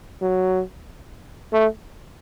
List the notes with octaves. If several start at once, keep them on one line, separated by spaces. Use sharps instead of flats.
F#3
A3